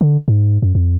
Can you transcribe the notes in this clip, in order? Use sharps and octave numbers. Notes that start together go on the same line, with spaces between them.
D3
G#2
F#2
F2